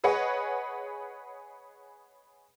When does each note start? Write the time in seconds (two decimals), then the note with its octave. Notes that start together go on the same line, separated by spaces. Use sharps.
0.04 G#4 B4 C#5 D#5 F#5